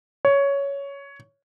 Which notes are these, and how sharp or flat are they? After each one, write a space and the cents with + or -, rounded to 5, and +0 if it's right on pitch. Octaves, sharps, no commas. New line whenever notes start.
C#5 +10